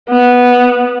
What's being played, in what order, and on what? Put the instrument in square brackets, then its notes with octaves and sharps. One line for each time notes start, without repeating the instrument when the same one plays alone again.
[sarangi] B3